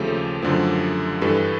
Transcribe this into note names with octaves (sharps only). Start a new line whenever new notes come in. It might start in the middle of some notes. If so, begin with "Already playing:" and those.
Already playing: D#2 C#3 F3 A3 G4 A4
F#2 D3 F3 A3
G2 E3 G3 A4 B4